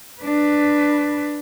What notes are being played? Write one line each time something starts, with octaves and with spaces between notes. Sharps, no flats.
D4 B4